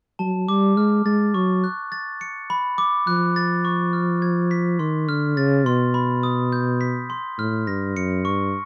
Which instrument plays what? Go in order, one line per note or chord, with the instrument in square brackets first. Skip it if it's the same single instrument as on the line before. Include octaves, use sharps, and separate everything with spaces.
[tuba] F#3 [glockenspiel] A5
[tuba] G3 [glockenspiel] D6
[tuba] G#3 [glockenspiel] F6
[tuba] G#3 [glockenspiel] A6
[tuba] F#3 [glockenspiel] C#6
[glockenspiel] F#6
A6
C#7
B5
D6
[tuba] F3 [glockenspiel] F#6
[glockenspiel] A6
C#6
F6
G#6
B6
[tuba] D#3 [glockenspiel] C6
[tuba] D3 [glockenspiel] F6
[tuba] C#3 [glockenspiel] A6
[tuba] B2 [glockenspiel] C6
[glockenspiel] B5
D#6
G6
B6
C6
[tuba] A2 [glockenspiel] F6
[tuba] G2 [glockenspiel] A#6
[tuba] F#2 [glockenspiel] C#7
[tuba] G2 [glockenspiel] C#6